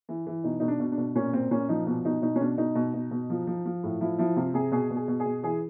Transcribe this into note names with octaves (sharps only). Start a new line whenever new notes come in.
E3
E3
B2 D#4
B2 D#4
D4
B2
D4
B2
A#2 C#4
A#2 C4
A#2 C#4
F3 D#4
B2
B2 D#4
B2 D#4
C#4
B2 D4
B2 D#4
B2
B2
B2
F3
F3
F3
A2
F3 E4
F3 E4
C3 F4
C3 G#4
B2 G#4
B2
G#4
B2
G#4
B2
E3 G#4